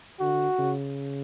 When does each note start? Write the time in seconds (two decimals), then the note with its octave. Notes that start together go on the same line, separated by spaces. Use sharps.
0.20 D3 F#4
0.59 C#3